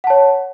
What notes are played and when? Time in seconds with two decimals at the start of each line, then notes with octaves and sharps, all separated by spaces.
0.04 F#5
0.07 A5
0.10 C#5